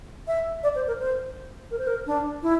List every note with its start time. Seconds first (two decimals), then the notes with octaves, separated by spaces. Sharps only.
0.28 E5
0.63 D5
0.75 C5
0.87 A#4
0.99 C5
1.71 A#4
1.79 C5
1.87 A#4
2.07 D4
2.43 E4